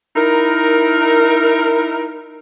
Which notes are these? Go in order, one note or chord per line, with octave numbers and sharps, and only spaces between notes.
D#4 E4 A#4